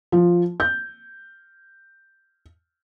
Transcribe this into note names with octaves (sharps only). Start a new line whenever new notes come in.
F3
G6